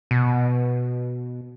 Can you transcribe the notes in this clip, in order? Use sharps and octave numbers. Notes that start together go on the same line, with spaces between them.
B2